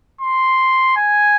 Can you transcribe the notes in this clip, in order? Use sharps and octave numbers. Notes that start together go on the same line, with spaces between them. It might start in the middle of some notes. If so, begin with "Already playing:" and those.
C6
G#5